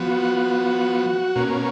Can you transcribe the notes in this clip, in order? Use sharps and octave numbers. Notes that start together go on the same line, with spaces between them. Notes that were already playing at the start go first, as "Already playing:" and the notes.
Already playing: F3 B3 F#4
B2 A#3 C#4